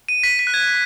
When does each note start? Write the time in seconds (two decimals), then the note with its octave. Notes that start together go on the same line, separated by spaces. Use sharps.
0.09 D#7
0.23 B6
0.39 B6
0.47 F#6
0.54 G#6